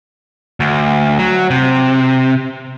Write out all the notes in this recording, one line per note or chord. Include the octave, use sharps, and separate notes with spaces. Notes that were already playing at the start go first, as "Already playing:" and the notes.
D2
F#3
C3